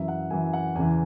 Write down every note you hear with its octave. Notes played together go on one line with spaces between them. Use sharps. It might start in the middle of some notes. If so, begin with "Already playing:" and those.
Already playing: F#2 E3 E5
F#5
F#2 E3 G#5
F#5
E2 C#3 E3 G#5